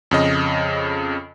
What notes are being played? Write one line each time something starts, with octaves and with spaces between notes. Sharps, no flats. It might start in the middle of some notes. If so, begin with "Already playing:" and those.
F2 C#3 D#5